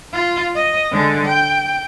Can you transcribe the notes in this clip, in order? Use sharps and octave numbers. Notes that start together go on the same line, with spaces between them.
F4
D#5
D3 G#3
G5